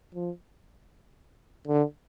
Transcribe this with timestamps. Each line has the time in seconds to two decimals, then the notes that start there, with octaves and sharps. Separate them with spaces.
0.15 F3
1.67 D3